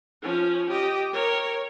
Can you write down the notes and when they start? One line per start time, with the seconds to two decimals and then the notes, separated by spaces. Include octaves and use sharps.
0.22 F3 C#4
0.69 G4 D#5
1.13 A#4 C#5